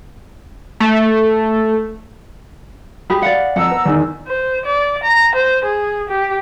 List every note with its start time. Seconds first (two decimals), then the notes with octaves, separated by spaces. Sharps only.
0.80 A3
3.10 G4 G#4 B5
3.22 D5 F5 F#5
3.56 F2 F#5 A#5 E6
3.71 B3
3.86 E2 D#3
4.28 C5
4.66 D5
5.04 A#5
5.35 C5
5.64 G#4
6.09 G4